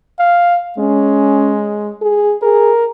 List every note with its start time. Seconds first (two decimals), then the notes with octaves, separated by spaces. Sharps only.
0.19 F5
0.78 G#3 C#4
2.02 G#4
2.42 G#4 A#4